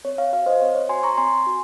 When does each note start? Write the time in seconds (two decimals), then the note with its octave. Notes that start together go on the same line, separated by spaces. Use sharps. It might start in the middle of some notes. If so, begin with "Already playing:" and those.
0.04 C4 C#5
0.18 C#5 F5
0.33 F#4 C#5 F5
0.46 C5 D#5
0.61 C4 C#5
0.75 C#5
0.89 F#4 G#5 C6
1.03 A#5 C#6
1.18 C4 G#5 C6
1.47 F#4